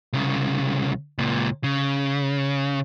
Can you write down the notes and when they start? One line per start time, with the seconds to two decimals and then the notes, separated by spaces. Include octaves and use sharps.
0.13 C2 C#3
1.18 C#2 A#2
1.64 C#3